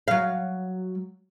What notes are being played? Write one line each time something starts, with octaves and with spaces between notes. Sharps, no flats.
F#3 F5